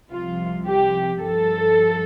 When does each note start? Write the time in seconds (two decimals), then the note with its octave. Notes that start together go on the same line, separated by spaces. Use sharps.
0.11 C2 C3 F3 F4
0.66 G4
1.20 G2 F3 A4